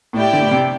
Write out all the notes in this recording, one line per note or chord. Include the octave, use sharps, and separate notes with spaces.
A2 E4 G4 D5 G5
D3
A2
C3